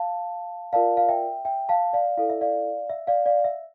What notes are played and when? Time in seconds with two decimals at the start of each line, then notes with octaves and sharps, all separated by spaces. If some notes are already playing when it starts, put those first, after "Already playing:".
Already playing: F5 A5
0.73 F4 A#4 D5 F5 A5
0.97 F5
1.09 E5 G5
1.45 E5 G5
1.69 F5 A5
1.93 D5 F5
2.17 E4 A4 D5 F5
2.30 E5
2.41 D5 F5
2.90 E5
3.07 D5 F5
3.26 D5 F5
3.44 E5